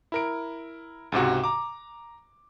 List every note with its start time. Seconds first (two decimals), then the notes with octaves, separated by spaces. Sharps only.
0.12 E4 A#4 D7
1.12 C#2 G#2 C3 F#4
1.44 A#5 D6